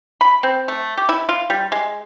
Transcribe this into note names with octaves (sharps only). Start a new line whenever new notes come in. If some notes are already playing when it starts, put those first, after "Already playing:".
B5
C4
A3
G4
E4
F4
G3
G#3